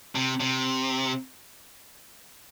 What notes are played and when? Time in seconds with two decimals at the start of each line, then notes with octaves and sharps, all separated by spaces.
0.15 C3
0.40 C3